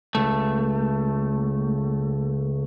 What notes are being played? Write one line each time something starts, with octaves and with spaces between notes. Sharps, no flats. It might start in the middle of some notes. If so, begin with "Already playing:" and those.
C#2 A3